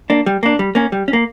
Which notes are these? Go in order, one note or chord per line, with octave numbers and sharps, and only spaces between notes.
A#3 D4
G3
A#3 D4
G3
A#3 C#4
G3
C#4
A#3